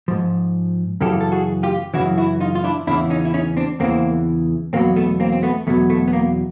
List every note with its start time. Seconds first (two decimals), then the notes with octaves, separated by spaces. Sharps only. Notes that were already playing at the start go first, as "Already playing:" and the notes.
0.08 G#2 F3
1.01 F#2 C#3 E3 G4 A4
1.21 A4
1.32 F#4 G#4
1.63 F4 G4
1.94 F#2 C#3 E3 E4 F#4
2.18 E4 F#4
2.40 D#4 F4
2.55 F4
2.64 D4 E4
2.87 E2 C#3 E3 D4 E4
3.10 C#4 D#4
3.25 E4
3.34 C#4 D#4
3.57 C4 D4
3.80 E2 C#3 E3 A#3 C4
4.73 E2 B2 F#3 A#3 C4
4.96 A3 B3
5.20 A#3 C4
5.32 C4
5.43 A3 B3
5.67 E2 B2 F#3 A3
5.90 A3
6.08 B3
6.13 A#3